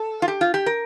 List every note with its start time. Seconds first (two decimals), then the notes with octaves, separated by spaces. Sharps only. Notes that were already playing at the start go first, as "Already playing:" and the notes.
Already playing: A4
0.22 F4
0.28 G4
0.41 F4
0.54 G4
0.66 A#4